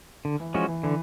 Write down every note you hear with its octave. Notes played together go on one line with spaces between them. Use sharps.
D3
E3
E3 F3 G#3 C#4 F#4
E3
D3 E3